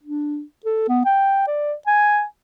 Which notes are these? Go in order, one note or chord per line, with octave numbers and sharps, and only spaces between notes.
D4
A4
B3
G5
D5
G#5